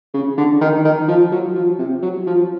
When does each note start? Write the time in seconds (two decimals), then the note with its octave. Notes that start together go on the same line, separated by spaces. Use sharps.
0.14 C#3
0.37 D3
0.61 D#3
0.85 D#3
1.08 F3
1.32 F#3
1.55 F3
1.79 C3
2.02 F#3
2.27 F3